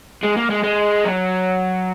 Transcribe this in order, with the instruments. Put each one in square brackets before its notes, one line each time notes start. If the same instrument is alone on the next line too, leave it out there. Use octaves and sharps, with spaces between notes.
[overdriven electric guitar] G#3
A#3
G#3
G#3
F#3